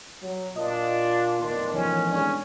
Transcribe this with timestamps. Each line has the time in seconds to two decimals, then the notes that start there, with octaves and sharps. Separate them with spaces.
0.22 F#3
0.56 A#2 D4 F4 D#5
1.42 B1 F2 A2 D#3 D4 C6
1.74 E3 F3 C#4
2.12 G#3 C#4 D4